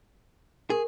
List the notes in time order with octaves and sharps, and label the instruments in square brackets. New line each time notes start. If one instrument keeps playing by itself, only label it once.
[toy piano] G4 A#4 [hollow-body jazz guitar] G#4